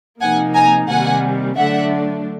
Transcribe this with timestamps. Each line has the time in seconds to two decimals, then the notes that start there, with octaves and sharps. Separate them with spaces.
0.21 C3 F3 A#3 D#4 F#5 G#5
0.55 G#5 A#5
0.89 C3 D#3 G3 A#3 F#5 G#5
1.56 D3 F#3 A3 D4 E5 F#5